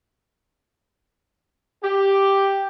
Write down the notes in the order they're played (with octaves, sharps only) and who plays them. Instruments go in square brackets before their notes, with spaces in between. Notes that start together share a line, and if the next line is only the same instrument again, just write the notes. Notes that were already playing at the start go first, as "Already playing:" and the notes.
[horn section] G4